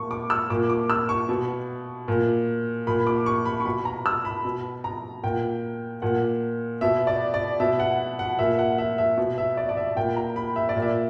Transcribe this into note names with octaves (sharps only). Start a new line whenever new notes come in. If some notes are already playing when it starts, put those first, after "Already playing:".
Already playing: A#2 C#6
D6
E6
A#2 D6
D6
E6
C#6
B2
A#2
A#2 B5
D6
C#6
B5
C#6
B2 B5
A#5
E6
B5
B2
A#5
A#2 G5
A#2 F#5
B2 E5
D5
D5
B2 E5
F#5
F#5
A#2 E5
F#5
E5
E5
B2
E5
D5
D5
E5
A#2 G5
A#5
B5
E5
D5
A#2
E5